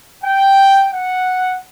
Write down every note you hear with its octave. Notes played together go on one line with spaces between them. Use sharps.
G5
F#5